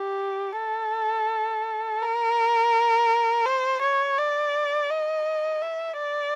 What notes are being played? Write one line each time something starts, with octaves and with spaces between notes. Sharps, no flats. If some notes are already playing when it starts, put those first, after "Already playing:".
Already playing: G4
A4
A#4
C5
C#5
D5
D#5
E5
D5